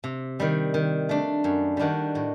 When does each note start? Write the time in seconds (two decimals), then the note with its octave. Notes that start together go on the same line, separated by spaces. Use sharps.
0.04 C3
0.40 D#3 G3
0.74 D#3
1.09 A3 D4
1.44 F#2
1.77 D#3 G3 D4 F#4
2.15 A2